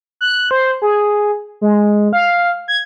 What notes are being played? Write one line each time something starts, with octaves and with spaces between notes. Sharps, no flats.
F#6
C5
G#4
G#3
F5
G#6